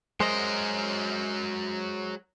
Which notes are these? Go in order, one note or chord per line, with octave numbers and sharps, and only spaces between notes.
F#3 G#3 A#4 C5 D#5